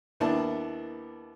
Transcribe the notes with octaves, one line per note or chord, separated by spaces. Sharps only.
D#2 A#3 B3 D4 E4 A5